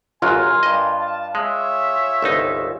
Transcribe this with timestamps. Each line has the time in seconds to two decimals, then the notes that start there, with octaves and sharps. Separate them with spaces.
0.22 G1 F#2 F#3 F4 A#4 G#5
0.63 G2 D#5
0.97 A5
1.35 G#3 G#4 C#5 E5
2.22 G1 C2 D#4